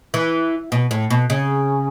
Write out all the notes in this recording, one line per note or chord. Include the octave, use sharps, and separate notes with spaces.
E3
B2
A2
B2
C#3